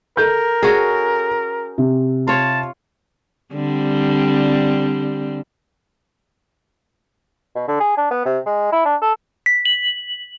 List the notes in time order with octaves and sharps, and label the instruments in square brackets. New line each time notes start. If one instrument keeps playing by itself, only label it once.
[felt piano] A4 G6 [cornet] A#4
[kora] C#4 F#4 G#4
[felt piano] C3
[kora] F4 C#5 [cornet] A5
[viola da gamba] D3 G3 C4
[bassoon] B2
D3
G#4
D4
B3
C3
G#3
E4
D4
A4
[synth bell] B6
F#7